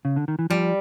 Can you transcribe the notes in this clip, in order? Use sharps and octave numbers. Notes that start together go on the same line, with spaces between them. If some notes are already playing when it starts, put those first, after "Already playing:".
C#3
D3
D#3
E3
F3 G3